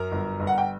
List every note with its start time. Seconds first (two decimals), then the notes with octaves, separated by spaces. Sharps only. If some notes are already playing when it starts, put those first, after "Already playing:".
Already playing: F#2 A#4 A#5
0.12 G1
0.40 G1
0.47 F#5
0.58 G5